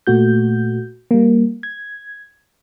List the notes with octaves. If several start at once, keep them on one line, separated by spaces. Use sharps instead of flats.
A#2 A3 F#4 G6
G3 A#3
G#6